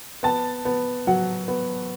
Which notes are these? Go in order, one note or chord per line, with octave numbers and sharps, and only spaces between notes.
B3 A5
B3
F#3 F#5
B3